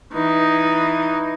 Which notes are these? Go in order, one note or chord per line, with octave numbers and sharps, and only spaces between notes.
E3 D#4